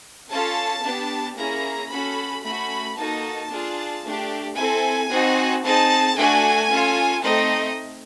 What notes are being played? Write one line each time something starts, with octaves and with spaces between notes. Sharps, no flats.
C#4 F4 A4 A5
B3 D4 G4
A#3 C#4 E4 G#4 A#5
C#4 F#4 A4 B5
A3 C#4 F#4 B5
A#3 D#4 F#4 A4 A5
D4 F4 G#4
A3 D4 G4
C4 E4 A4 G#5
C4 D#4 F#4
C4 D#4 G#4 A5
A3 D4 F#4 A4 G#5
C#4 F4 A4
A3 C4 D#4 D#5